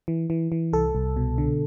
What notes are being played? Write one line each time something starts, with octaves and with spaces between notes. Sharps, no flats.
E3
E3
E3
C2 A4
C2
B2
D3